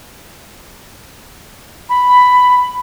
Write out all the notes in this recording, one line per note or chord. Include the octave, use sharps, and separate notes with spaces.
B5